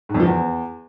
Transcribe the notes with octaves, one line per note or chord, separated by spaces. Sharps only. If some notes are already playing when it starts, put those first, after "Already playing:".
G#2
F2
F3
E2